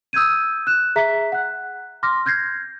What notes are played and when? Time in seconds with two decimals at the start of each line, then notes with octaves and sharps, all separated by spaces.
0.13 D#6 E6 G6 G#6 D#7
0.67 F#6 E7
0.96 G#4 E5 A#5 B6
1.32 F#5 F#6
2.03 C6 D6 F6 A#6
2.26 F6 G6 G#6 A#6 C7